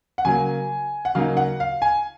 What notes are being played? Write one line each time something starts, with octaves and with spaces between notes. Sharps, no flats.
F#5
C#3 F#3 A#3 G#5
F#5
C#3 F#3 A#3 D#4 F5
F#5
F5
G#5